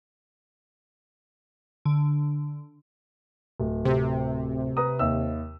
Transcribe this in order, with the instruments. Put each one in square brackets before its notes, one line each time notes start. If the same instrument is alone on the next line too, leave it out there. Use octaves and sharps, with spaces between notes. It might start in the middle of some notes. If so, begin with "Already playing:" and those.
[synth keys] D3
[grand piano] D1
[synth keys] C3
[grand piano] B4 A#5 D#6
D#2 E5 E6